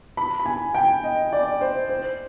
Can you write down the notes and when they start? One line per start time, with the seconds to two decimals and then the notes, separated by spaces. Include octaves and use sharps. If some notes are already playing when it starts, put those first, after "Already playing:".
0.17 B5
0.40 B5
0.46 G#5
0.75 G5
1.04 D#5
1.33 D5
1.61 C5
1.89 C5